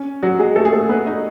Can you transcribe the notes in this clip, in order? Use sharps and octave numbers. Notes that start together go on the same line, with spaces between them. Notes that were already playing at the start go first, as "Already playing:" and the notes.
Already playing: C#4
F#3 F#4
G#3 G#4
A3 A4
G#4
A3 A4
B3 B4
D#4 D#5